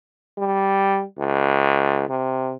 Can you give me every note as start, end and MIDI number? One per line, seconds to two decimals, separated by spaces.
0.38 1.04 55
1.18 2.07 37
2.09 2.54 48